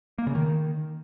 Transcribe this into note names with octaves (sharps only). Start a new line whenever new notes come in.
A#3
C#3
D#3